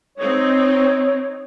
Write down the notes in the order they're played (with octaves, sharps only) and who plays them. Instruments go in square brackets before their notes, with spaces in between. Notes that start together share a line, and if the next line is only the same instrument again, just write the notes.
[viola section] C4 D#4 [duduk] C#5